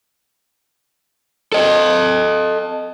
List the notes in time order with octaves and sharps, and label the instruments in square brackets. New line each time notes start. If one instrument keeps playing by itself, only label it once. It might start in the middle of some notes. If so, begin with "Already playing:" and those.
[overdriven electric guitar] A4 D#5